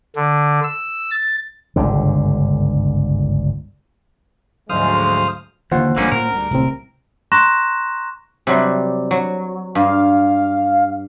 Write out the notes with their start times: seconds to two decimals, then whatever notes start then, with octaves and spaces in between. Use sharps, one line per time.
0.16 D3
0.64 E6
1.11 A6
1.76 G1 C#2 G#2 D3
4.69 D2 G#2 F3 F#3 G#3 C5 F5 D#6
5.72 D#2 D3 E3 F4 C5 F#5
5.97 A1 G2 D3 G3 A#3 C#4
6.12 A2 A#3 C#4 A#4
6.33 D2 G3
6.51 D1 C2 A2 C3 C4
7.32 A#5 C6 C#6 F#6 A#6 E7
8.47 C3 F#3 G3
9.11 F#3
9.75 G2 F5